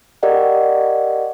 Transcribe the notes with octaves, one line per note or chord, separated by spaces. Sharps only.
G4 A#4 D5 D#5 F#5